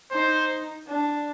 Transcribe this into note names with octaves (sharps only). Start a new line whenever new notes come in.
D#4 C5
D4